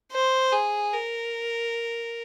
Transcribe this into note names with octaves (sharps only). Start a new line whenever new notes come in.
C5
G#4
A#4